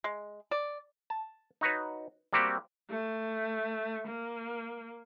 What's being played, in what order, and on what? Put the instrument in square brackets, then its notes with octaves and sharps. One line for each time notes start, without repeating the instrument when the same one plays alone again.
[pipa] G#3
D5
[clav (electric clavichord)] A5
D#4 F#4 B4 C#5
G3 A#3 C4 F#4 G4
[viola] A3
A#3